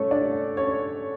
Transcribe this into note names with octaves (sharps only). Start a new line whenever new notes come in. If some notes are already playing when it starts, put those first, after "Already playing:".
Already playing: G3 A3 C#4 A4 C#5
D4 D5
C#4 C#5